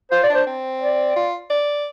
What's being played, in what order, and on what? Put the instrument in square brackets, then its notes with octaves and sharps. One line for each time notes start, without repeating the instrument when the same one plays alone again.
[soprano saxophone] F4 [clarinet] C5
[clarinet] D5
[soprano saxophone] D4 [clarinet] C5
[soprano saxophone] C4
[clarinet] D5
[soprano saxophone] F4
D5